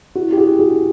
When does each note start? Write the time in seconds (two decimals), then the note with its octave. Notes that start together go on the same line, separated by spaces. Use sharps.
0.15 E4 F#4
0.32 G4
0.37 F#4 G#4
0.59 F#4 G#4